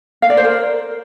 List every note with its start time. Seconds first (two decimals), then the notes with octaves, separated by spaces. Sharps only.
0.22 F5
0.30 D5
0.37 C5
0.45 A#4